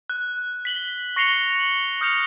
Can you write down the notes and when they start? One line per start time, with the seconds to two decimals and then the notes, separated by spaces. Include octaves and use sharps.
0.10 F#6
0.65 B6 F#7 G7
1.16 C#6 A#6 C7 C#7 F7 G7
1.60 F#7
2.01 D#6 F6 G6 C#7 F7